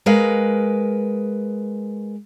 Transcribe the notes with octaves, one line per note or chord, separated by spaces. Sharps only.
G#3 A#4 B4 F5